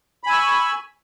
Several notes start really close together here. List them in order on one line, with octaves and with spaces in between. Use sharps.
B5 G#5 E6 C#6